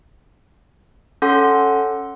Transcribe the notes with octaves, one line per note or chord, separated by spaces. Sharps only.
C#4 A4 F#5 C6